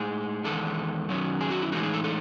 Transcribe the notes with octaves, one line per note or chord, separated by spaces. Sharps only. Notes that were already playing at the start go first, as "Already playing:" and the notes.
Already playing: A2 G#3 D#4 G#4
E2 D#3 G#3 A4
F#2 D#3 F#3 C#4
G#4
F#4
E4
A2 E3 G#3 D#4 F#4
G#4
A4
A4